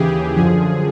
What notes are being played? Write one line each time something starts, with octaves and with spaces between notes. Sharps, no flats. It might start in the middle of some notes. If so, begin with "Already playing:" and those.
Already playing: D#2 C#3 E3 G4 G#4
F#2 D3 F3 G#4